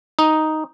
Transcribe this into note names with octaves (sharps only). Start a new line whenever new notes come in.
D#4